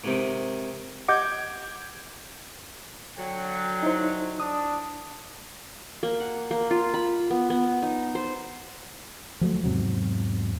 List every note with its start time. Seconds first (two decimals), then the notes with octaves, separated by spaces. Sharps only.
0.04 G#2 C3 D#3
1.08 G4 D#5 F#5 D6 G6 G#6
3.18 D3 F#3 G5
3.83 D#4 E4 C5
4.40 D4 D#6
6.03 A#3
6.20 F#5
6.51 A#3
6.71 F4
6.94 B5
7.31 B3
7.50 B3
7.82 D#4
8.15 C5
9.41 F3 F#3 G#3 A3
9.64 E2 G#2 C3 F#3